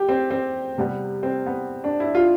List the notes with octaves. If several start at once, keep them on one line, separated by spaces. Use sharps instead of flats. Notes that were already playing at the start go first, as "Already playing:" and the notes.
Already playing: G4
C4
C4
C3 G3 B3
C4
B3
D4
E4
F4